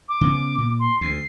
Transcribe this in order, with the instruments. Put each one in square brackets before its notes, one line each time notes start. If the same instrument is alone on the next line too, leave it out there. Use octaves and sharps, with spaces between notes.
[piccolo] D6
[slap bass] C#3 B3
A#2
[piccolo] C6
[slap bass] D2 [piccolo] C7